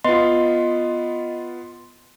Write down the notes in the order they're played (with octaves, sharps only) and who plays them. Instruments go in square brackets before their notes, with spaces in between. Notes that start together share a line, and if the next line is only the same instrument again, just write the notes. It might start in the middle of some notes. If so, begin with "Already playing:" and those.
[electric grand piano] B3 F4 [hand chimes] D#5 [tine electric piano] C6